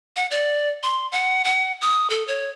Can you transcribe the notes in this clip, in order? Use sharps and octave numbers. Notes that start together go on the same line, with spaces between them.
F#5
D5
C6
F#5
F#5
D#6
A4
C#5